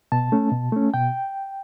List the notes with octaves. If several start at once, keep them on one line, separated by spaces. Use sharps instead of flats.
B2 A5
A3 C#4
B2
A3 C#4
B2 G5